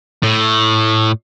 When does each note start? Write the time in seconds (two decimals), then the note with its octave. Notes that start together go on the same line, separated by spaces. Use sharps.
0.23 A2